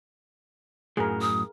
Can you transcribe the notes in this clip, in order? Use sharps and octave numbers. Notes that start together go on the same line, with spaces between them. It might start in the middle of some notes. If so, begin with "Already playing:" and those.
F#2 A2 F#3 G#4 A#4
D#6